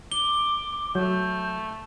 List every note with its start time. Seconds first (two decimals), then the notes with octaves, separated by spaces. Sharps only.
0.12 D6 G7
0.95 F#3 A3 G6